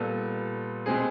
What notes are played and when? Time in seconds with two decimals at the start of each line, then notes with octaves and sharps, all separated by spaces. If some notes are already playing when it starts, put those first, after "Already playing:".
Already playing: A#2 G3 B3 A4
0.86 B2 G#3 C4 G#4